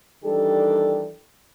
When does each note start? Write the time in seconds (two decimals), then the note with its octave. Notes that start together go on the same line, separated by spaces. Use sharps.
0.24 D#3 E3 G3 D4 G4 A4